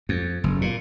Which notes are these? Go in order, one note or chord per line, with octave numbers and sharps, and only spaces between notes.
F2
F#1
A#2